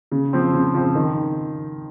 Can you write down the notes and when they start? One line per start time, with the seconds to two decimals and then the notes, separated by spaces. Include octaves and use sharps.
0.12 C#3
0.33 F3 C4
0.53 C#3
0.75 F3 C4
0.95 D#3